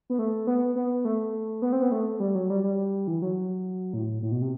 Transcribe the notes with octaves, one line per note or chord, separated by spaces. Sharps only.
B3
A3
B3
B3
A3
B3
C4
B3
A3
G3
F#3
G3
G3
E3
F#3
A2
A2
B2
C3